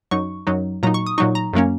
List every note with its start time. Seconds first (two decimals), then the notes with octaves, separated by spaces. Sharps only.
0.11 F#2 F#3 D#4 C#6
0.47 F#2 F#3 D#4
0.83 A#2 F#3 D#4 A#5
0.94 C#6
1.06 D#6
1.18 A#2 F#3 D#4 C#6
1.35 A#5
1.53 F#2 F#3 A#3 C#4